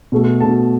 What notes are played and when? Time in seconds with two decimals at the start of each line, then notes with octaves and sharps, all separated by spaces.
0.12 B2 A3
0.40 B2 A3 A5